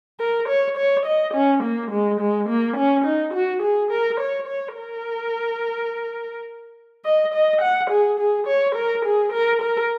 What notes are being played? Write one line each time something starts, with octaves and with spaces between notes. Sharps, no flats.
A#4
C#5
C#5
D#5
C#4
A#3
G#3
G#3
A#3
C#4
D#4
F#4
G#4
A#4
C#5
C#5
A#4
D#5
D#5
F#5
G#4
G#4
C#5
A#4
G#4
A#4
A#4